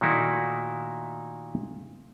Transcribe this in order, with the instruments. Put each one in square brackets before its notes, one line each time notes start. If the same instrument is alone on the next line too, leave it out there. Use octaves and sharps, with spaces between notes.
[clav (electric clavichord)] A#2 D#3 A3 D#4 E4 F#4